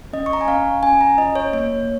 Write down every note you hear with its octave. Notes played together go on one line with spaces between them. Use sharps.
C#4 D#5
C#6
A#5
G#5
C#4 F5
C#4 G#5
A#5
F4 D#5
C#5
A#3 C#5